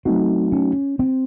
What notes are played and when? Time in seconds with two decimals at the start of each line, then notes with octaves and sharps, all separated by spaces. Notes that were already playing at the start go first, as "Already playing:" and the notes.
0.05 F#3 A3 C4 D#4 F#4
0.52 C#4
0.99 C4